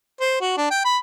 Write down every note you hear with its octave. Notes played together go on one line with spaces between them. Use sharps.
C5
F#4
D4
G5
B5